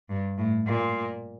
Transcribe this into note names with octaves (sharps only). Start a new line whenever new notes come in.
G2
A2
A#2